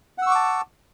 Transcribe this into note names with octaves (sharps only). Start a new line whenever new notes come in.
F#5 A5 C#6 D6 E6